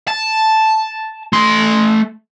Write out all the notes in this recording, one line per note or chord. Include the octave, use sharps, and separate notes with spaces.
A5
A3 C6